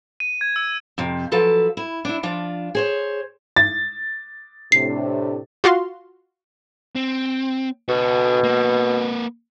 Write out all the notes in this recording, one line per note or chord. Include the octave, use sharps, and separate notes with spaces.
D#7
G#6
E6
F2 C3
F3 F#3 A4 B4
E4
D4 E4
F3 D4 F4
G#4 C5 C#5
A6
A2 C3 D4 C7
F4 F#4 F5 C6
C4
B2 F#4 A4
A#3 B4